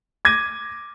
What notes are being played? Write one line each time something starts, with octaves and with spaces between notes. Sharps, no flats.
D6 G#6 A#6 D#7